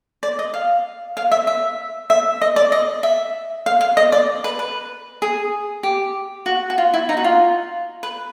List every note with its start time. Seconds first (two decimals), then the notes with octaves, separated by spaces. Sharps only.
0.23 D5
0.39 D#5
0.54 F5
1.17 F5
1.32 E5
1.47 E5
2.10 E5
2.42 D#5
2.56 D5
2.72 D#5
3.03 E5
3.66 F5
3.81 F5
3.97 D#5
4.12 D5
4.44 B4
4.59 B4
5.22 G#4
5.83 G4
6.46 F#4
6.70 F#4
6.78 F4
6.94 E4
7.09 D#4
7.17 F#4
7.24 F4
8.03 B4